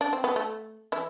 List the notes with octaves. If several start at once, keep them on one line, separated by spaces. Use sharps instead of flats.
D4
C4
B3
A3
E3 E4